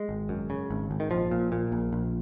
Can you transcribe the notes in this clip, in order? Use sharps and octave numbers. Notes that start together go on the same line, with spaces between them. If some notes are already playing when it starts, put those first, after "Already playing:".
Already playing: G#3
G#1
F#2
C#3
G#1
G#1
D#3
A#1 F3
A#2
A#2
A#1
A#1